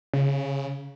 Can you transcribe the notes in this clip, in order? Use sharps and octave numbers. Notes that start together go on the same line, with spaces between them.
C#3